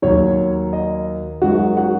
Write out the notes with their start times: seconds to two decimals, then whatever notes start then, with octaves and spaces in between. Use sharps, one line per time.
0.02 D#2 D#3 F#3 C#5
0.73 D#5
1.42 F#2 D#3 G#3 F#4 F#5
1.77 F#4 F#5